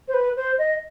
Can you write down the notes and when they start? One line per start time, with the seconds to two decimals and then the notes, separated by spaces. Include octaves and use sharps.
0.08 C5
0.14 B4
0.37 C5
0.58 D#5